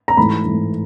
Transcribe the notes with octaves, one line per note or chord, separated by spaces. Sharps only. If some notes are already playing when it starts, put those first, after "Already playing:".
A#5
G#2 E3 A3 B5
G#2 E3 A3